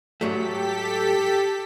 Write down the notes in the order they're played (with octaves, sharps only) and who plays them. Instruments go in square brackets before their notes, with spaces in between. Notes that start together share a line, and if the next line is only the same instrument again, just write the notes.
[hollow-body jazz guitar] G#2 F#3 A3 [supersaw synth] G4 A4 B6